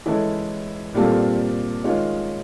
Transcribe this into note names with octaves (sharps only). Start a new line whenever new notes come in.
E3 G#3 C#4 E4 A4
A#2 G3 C4 F4 A4
D#3 G#3 C#4 F4